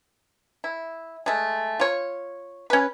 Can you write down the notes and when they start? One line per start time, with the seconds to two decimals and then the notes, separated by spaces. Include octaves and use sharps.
0.64 E4
1.26 G#3 A3
1.80 F4 C#5
2.70 C#4 B4